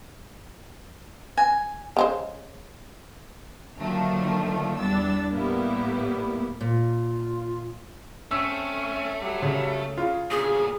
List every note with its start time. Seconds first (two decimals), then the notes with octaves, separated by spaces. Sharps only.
1.37 G#5
1.97 C#3 G#3 C5
3.79 D3 D#3 F3 F#3 A3 A#3
4.79 E2 G3 D4 E6 A6
5.33 A2 G3 A#3 B3 E4
6.61 A#2 F4
8.31 A3 C4 C#4 E6
9.21 F#3 G3
9.42 C#3
9.98 C#3 F4
10.31 D2 G2 A#2 C#3 G#4 G#5